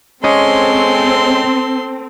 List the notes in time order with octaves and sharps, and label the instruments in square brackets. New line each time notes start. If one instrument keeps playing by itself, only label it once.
[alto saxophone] G#3 [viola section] C4 [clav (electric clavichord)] C#4 D#5 [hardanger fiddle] A4 C6